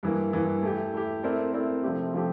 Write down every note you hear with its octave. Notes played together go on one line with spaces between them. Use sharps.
G2 E3 A#3
G2 E3 A#3
A3 E4 G4
A3 E4 G4
A3 C4 E4 A#4 D5
A3 C4 E4 A#4 D5
C3 F3 A3 C4 G4
C3 F3 A3 C4 G4